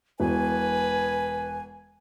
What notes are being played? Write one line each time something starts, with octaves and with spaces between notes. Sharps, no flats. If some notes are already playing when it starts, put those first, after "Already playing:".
E1 B4 G#5